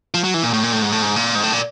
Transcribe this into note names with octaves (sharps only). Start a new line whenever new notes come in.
F3
F#3
E3
A#2
A2
A#2
A2
G#2
A2
G#2
A#2
G#2
A2
A#2